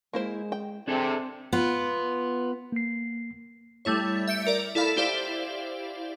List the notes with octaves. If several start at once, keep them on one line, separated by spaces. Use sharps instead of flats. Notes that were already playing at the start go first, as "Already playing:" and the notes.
G#3 A#3 E4 C5
G5
C3 C4 D4 G#4 A4
B3 F4
A#3 C7
G3 A3 E4 C#5
E5 G6 C#7 D7
A#4 D5
E4 A4 D5 F5 B5
E4 G4 C5 D5 E5 F5